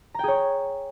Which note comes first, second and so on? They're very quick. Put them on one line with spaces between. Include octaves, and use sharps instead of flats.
A#5 G5 G#4 C#5